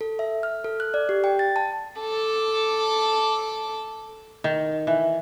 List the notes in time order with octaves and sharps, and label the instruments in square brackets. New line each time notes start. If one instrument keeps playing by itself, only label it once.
[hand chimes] A4
E5
F6
A4
F#6
D5
G4
G5
A6
A5
[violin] A4 D6
[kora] D#3
E3